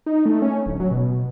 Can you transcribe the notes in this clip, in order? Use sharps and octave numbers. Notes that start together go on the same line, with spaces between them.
D#4
A3
C#4
D1
F#3
B2